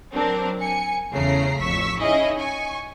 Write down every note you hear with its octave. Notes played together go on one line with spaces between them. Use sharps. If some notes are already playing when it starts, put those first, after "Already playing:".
F#3 C4 D4 A#4
G#5 C#7
E2 C#3 A3 A#5 C7
A1 F2 C#6 E6 B6
C#4 D#4 E4 G#4 D#5
G#5 C#6